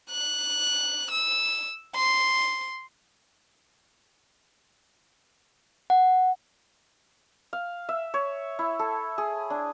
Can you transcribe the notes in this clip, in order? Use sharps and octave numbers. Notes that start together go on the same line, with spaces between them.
F#6
E6
C6
F#5
F5
E5
C#5
E4
A4
G#4
D4